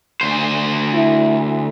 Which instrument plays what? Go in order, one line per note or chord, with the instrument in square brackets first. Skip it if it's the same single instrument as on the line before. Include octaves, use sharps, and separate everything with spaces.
[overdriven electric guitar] D2 C5
[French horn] E4